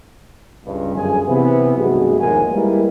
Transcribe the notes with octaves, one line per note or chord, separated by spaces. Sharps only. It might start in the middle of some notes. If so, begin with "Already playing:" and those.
C#2 G2
G1 F#2 F3 G#4 G#5
C3 E3 B3
B1 G2 A3 F#4 G#4
A#1 D#2 G#2 B2 A#4 G#5
G3 G#3 A#3 E4 A#4 B4